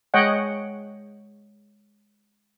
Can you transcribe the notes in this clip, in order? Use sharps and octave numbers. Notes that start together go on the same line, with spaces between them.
G#3 C#5 D#5 F#5 G5